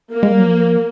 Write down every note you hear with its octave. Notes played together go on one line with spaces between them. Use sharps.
A#3
G#3
G3
F#3
F3